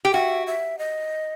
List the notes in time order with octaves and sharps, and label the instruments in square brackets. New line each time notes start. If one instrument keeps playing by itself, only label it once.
[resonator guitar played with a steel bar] G4
[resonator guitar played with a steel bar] F#4 [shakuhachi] E5
[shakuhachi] E5
D#5